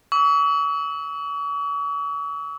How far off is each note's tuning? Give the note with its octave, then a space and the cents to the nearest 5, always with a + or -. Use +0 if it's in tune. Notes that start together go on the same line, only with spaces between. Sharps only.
C#6 +45 E6 -40